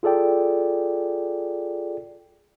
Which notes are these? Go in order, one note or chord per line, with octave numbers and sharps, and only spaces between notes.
F4 G#4 A4 D5 G5